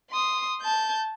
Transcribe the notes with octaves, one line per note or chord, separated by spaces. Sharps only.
C6 D#6
A5 G6